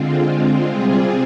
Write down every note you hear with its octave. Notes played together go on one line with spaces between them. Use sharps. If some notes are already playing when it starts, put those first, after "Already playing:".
Already playing: D3 G#3 C4 F4
C3 G3 C4 F4 G#4